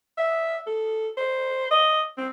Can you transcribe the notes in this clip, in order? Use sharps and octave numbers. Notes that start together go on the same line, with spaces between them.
E5
A4
C5
D#5
C4